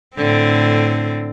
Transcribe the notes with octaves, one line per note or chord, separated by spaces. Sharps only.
A2 D3 C4